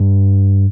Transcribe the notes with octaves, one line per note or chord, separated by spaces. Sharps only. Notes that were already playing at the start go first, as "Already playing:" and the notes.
Already playing: G2